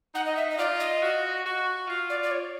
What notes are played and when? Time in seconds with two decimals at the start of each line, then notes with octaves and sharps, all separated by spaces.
0.15 D#4 F#5
0.26 D#5
0.37 E5
0.51 D#5
0.58 F4 D5
0.80 D#5
1.02 F#4
1.45 F#4
1.88 F4
2.10 D5
2.23 D5
2.31 C#5